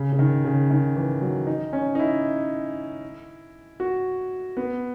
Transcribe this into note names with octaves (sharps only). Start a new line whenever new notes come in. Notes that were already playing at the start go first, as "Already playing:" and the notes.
Already playing: C#3
C#3
D#3
C#3
D#3
E3
F#3
D#4
C#4
D#4
E4
F#4
B3